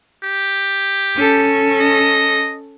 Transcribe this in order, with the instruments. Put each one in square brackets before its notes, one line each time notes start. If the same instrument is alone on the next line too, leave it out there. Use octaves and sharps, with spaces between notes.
[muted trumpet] G4
[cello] C#4 A4
[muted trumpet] D#5